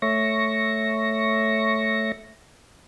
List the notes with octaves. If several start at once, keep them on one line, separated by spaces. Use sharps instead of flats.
A3 C#5 E5 C#6 A#6